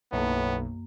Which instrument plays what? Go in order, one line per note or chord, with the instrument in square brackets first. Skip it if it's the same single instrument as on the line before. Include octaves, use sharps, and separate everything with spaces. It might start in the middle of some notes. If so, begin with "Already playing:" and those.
[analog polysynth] B1 [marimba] F#2 A#3 [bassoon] A2 [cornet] B3